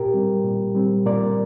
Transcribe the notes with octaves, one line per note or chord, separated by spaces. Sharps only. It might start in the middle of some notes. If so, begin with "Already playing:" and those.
Already playing: A#2 G4 A#4
G3 C4
A#2
G3 C4
A#2 A#4 D5